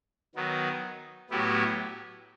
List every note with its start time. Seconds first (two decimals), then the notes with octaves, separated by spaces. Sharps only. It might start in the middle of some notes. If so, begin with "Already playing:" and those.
0.35 D#3 F#3 B3
1.30 A2 F#3 B3 E4 G4